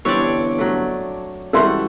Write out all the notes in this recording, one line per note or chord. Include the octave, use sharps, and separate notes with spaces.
G1 E3 G3 C4 D4 C#5
F#3 A3
C#2 E3 G3 F#4 A4 E5 C6